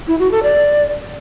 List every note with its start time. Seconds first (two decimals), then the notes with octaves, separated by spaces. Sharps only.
0.08 E4
0.20 F#4
0.31 A4
0.43 D5